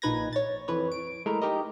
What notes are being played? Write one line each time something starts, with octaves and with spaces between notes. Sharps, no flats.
A#1 A#2 D#4 B4 G#6 A#6
C#5 A6
F2 E3 B4 C#5
D7
G#3 A3 E4 A#4
D#4 G4 A#4 D#5